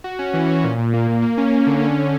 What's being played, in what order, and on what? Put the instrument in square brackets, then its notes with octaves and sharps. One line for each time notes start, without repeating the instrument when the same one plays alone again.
[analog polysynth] F#4
C#4
E3
C#4
A#2
A#2
A#3
A#2
A#3
C#4
A#3
D3
C#4